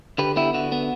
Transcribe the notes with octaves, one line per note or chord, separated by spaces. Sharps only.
D3 G4 B4
B3 E4 G4
D3 F#4
B3